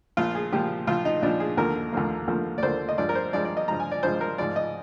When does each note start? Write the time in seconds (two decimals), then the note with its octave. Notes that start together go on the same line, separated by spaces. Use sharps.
0.17 A#1 A#2 F3 F4
0.35 G#4
0.52 A#1 A#2 F3 G4
0.87 A#1 A#2 F3 F4
1.05 D#4
1.22 A#1 A#2 F3 D4
1.40 G#4
1.57 D#2 D3 F3 A#3 A#4
1.93 D#2 D3 F3 A#3
2.28 D#2 D3 F3 A#3
2.58 D5
2.63 D#2 D3 F3 A#3 C5
2.89 D#5
2.98 G2 F3 G#3 D5
3.09 A#4
3.15 C5
3.33 G2 F3 G#3 D5
3.45 D5
3.57 D#5
3.68 G2 F3 G#3 A#5
3.80 G#5
3.91 D5
4.03 G2 F3 G#3 C5
4.21 A#4
4.38 G#2 F3 G#3 D5
4.56 D#5